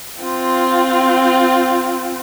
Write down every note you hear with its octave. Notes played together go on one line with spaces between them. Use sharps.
C4 F4